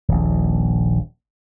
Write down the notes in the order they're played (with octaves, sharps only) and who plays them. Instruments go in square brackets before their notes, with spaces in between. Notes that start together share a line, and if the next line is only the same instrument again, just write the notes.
[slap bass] D#1 A#1